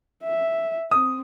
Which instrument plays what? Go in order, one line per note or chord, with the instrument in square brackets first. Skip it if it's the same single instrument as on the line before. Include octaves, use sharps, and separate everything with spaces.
[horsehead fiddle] E5
[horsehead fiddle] C4 [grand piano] D#6